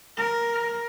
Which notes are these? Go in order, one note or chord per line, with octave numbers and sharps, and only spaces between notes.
A#4